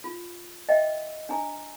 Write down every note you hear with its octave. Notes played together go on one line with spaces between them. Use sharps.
F4
D#5 E5 G5
D4 G#5 A#5